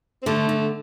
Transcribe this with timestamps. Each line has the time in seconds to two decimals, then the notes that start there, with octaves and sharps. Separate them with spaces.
0.22 C4
0.26 D3 A3
0.49 D3